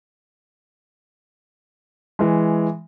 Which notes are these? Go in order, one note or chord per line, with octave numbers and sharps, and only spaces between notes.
E3 G#3